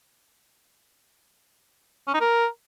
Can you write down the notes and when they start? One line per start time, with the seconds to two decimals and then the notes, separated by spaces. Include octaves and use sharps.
2.07 C#4
2.14 D#4
2.20 A#4